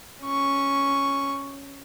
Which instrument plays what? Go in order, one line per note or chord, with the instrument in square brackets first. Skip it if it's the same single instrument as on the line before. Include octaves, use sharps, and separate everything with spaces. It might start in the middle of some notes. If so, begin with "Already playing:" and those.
[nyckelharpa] C#4 C#6